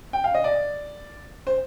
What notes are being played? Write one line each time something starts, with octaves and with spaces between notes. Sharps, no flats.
G5
F5
D#5
D5
C5